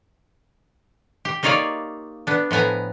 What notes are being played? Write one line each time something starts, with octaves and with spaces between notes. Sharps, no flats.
G4
A#3 D#4 F4 C#5 D5 F5
B3 D4
A2 F3 B3 G#5 A#5